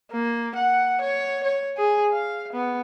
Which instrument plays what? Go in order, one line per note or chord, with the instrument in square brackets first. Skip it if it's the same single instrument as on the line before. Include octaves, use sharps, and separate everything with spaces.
[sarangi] A#3
F#5
C#5
C#5
G#4
F5
B3